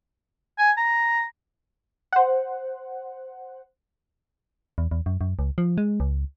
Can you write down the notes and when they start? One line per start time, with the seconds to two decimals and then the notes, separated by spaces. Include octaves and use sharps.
0.58 G#5
0.77 A#5
2.13 C5 F#5
4.78 E2
4.91 E2
5.06 F#2
5.21 F#2
5.39 C#2
5.58 F3
5.78 G#3
6.00 C#2